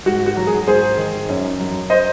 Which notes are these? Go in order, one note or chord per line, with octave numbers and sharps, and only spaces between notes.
G#2 F#4
F#4
F#3
G#4
G#2 G#4 C5
D#3
F#2
F#3
C5 D#5